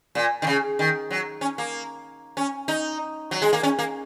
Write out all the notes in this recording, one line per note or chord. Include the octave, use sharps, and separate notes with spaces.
A#2
D#3
C#3
D#3
F#3
C#4
A#3
C#4
D#4
F#3
G#3
A#3
C#4
A#3